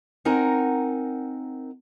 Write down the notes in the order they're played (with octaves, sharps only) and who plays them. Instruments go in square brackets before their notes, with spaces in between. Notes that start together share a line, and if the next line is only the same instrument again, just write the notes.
[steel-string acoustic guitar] C4 D#4 A#4 F#5 G#5 A#5